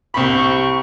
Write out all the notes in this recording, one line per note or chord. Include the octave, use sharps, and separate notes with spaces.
C2 C4 G4 B5 C#6